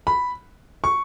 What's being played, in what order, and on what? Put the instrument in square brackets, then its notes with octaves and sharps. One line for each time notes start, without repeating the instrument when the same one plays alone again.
[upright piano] B5
C#6